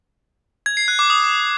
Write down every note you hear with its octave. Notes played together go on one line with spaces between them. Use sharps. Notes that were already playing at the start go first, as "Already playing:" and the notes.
G#6
C7
F#6
D6
D#6